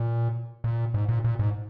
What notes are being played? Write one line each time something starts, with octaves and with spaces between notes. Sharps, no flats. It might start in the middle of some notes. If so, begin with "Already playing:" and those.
Already playing: A#2
A#2
G#2
A#2
A#2
G#2